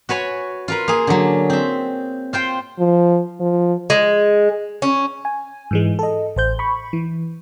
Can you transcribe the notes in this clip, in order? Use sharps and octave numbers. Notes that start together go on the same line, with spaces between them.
F#4 B4 C#5 G#5
F4 A#4 B4
A#3 G#4
D3 F#3
C4 E5
F4 C5 G5
F3
F3
G#3
C#4
G#5
G#2 E3 G#3
A4 D#5
A1 C5 G6
B5 C#6
E3